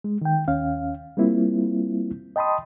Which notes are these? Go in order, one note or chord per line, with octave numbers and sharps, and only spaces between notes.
G#3
D#3 G5
D#2 C#4 F5
G3 A#3 C4 E4 F4
D#5 G5 A5 B5 C6 D#6